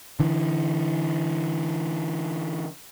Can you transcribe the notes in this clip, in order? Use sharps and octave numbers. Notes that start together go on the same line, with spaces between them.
D3 E3